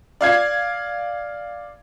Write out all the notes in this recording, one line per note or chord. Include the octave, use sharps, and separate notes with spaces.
D5 F5 G#6 C7